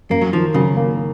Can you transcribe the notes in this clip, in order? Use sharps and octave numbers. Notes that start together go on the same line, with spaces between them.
F#2 A#3
F#3
D#3 F3
C#3 F#3
A#3